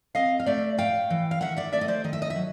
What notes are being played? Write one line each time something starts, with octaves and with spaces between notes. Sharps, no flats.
C4 D#5 F5
F5
A3 D5 E5
A2 F5 G5
E3
F5
D#3 E5 F#5
D5 E5
A3 D5 E5
D#5
C5 D5
D#3 D#5
E5
D#5
E5
F#3